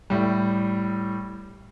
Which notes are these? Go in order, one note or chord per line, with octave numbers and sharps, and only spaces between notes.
A2 G3